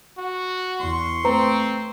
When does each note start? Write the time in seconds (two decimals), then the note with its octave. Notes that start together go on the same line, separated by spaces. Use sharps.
0.18 F#4
0.80 E2 C6 C#6
1.24 A3 C4 B4 C5 A#5